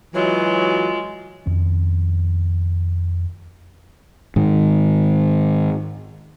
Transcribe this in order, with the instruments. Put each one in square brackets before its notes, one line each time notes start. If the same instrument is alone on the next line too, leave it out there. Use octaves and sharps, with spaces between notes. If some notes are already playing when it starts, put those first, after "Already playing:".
[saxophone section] E3 F#3 [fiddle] G#3 [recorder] F4
[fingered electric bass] F2 D#3 C#4
G#2 D#3